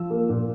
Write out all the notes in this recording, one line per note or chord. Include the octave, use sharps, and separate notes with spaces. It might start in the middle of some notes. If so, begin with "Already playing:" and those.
Already playing: F3 E6
A#3
A#2